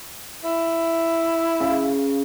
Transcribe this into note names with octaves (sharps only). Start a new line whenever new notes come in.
E4
C#3